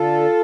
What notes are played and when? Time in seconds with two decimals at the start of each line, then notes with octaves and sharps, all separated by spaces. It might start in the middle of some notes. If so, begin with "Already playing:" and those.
Already playing: D3 F4 A4